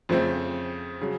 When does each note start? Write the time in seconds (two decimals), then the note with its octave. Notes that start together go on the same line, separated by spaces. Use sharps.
0.09 F2 C#3 F3 A3 C4
1.01 C#3 F#3